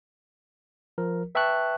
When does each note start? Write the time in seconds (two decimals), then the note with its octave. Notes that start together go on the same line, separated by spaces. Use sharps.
0.98 F3 A#4
1.35 B4 E5 G5 A5 C#6 F#6